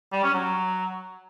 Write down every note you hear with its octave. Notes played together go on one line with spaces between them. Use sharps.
G3
C#4
F#3